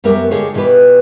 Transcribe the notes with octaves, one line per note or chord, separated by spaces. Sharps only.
F#2 G3 B3 G4 A#4 E5
D3 G#3 F4 G4 G#4 C#5
E2 B2 E3 G4 B4